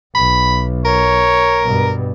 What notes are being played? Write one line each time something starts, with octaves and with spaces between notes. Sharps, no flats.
B1 B5
A#4 C#5
G2 B2